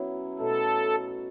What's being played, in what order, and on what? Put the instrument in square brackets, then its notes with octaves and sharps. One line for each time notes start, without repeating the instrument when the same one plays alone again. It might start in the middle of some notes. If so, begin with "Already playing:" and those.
Already playing: [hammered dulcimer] F#3 B3 C#4 E4
[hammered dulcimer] B2 F#3 A3 [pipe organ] A4